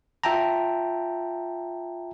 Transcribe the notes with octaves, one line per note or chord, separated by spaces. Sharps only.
F4 E5 G5 A5 A#5